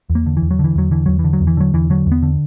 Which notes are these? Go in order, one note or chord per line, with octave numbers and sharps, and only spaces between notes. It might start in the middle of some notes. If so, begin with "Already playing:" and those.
E2
A#3
D3
E3
E2
F#3
D3 E3
E2 F#3
D3 E3
E2 F#3
E3
D3
F#3
E2
E3
D3 F#3
E2 E3
D3 F#3
E2
B3
D3